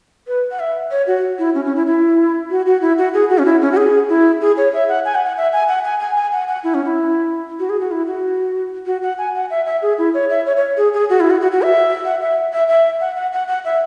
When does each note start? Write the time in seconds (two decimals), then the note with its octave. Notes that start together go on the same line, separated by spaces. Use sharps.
0.27 B4
0.51 F#5
0.59 E5
0.91 C#5
1.07 F#4
1.39 E4
1.55 C#4
1.65 C#4
1.76 E4
1.87 E4
2.51 F#4
2.66 F#4
2.82 E4
2.98 F#4
3.14 G#4
3.30 F#4
3.38 C#4
3.45 E4
3.61 C#4
3.72 F#4
3.77 G#4
4.09 E4
4.41 G#4
4.57 C#5
4.73 E5
4.88 F#5
5.05 G#5
5.15 F#5
5.25 F#5
5.37 E5
5.53 G#5
5.68 F#5
5.84 G#5
6.00 G#5
6.16 G#5
6.32 F#5
6.48 F#5
6.64 E4
6.74 C#4
6.85 E4
7.59 F#4
7.69 G#4
7.80 F#4
7.91 E4
8.07 F#4
8.86 F#4
9.02 F#5
9.18 G#5
9.35 F#5
9.50 E5
9.66 E5
9.82 G#4
9.98 E4
10.14 C#5
10.30 E5
10.46 C#5
10.57 C#5
10.77 G#4
10.94 G#4
11.10 F#4
11.20 E4
11.30 F#4
11.41 F#4
11.52 F#4
11.62 E5
12.05 F#5
12.21 E5
12.53 E5
12.68 E5
13.01 F#5
13.16 F#5
13.33 F#5
13.48 F#5
13.65 E5